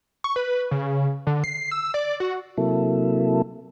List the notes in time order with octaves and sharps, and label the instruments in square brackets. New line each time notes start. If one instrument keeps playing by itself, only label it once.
[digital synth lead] C#6
B4
C#3
D3
C7
E6
D5
F#4
[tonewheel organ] C3 F#3 A#3 E4 A4